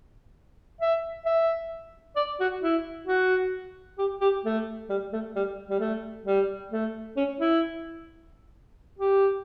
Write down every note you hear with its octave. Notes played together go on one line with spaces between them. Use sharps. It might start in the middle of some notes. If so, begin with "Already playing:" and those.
E5
E5
D5
F#4
E4
F#4
G4
G4
A3
G3
A3
G3
G3
A3
G3
A3
C#4
E4
G4